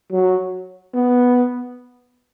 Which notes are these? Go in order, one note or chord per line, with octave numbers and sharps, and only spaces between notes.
F#3
B3